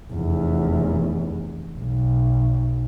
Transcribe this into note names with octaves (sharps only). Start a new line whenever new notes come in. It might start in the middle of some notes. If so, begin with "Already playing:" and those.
F1 E2
B1